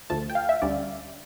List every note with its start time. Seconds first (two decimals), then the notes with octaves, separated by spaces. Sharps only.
0.10 D2 D3 F3 A3 A5
0.30 G5
0.35 F5
0.49 E5
0.62 D2 D3 G3 C#4 D5